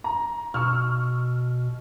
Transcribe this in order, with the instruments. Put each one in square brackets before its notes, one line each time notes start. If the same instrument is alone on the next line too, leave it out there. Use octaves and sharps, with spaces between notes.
[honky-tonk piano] A#5
[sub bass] B2 [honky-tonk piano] C#6 E6 F6